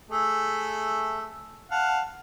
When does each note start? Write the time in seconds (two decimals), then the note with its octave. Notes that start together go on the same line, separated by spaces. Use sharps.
0.11 A3 G#4 E5
1.71 F5 F#5 A5